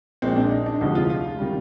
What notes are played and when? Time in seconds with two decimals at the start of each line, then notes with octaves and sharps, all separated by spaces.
0.22 A#1 A#2 G#3 C4
0.36 D4
0.51 D#4
0.66 D4
0.81 D2 C3 F3 G#3 D#4
0.95 F4
1.10 F4
1.39 C3 D#3 G3